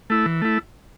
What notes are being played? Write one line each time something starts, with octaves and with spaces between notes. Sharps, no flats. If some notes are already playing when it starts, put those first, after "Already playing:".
A3 E4
E3
A3 E4